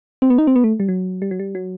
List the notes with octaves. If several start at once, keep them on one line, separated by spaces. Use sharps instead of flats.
C4
B3
D#4
C4
B3
A3
G3
F#3
G3
F#3
G3
F#3